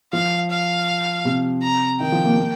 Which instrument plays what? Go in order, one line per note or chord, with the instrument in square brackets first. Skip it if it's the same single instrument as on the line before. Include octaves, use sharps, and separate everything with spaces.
[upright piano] F3 [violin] F5
[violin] F5
[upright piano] C3
[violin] A#5
[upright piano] D#3 [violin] G5
[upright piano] F3
A#3
A#3